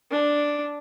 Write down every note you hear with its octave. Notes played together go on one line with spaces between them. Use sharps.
D4